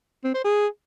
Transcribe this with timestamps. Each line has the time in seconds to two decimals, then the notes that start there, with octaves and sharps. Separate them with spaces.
0.24 C4
0.34 C5
0.44 G#4